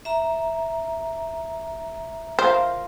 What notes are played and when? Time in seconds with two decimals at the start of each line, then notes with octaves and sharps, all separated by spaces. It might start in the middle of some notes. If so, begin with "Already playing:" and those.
0.05 E5 A#5
2.39 F4 A#4 C5 F5